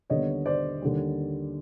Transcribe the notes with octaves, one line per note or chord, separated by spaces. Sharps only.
D#2 D3 G3 B3 C#5 D#5
C5 D5
D#2 D3 G3